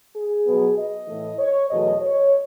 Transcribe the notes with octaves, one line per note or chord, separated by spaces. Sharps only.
G#4
B2 F#3 B3
D#5
A2 E3 A3
C#5
E2 B2 F#3 A3 D#5
C#5